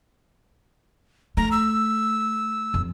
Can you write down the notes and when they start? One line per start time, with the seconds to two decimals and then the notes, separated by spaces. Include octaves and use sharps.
1.37 A3 A#5
1.52 E6
2.74 F2